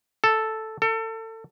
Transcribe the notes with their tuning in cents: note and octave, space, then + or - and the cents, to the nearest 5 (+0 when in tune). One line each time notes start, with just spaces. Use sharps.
A4 +0
A4 +30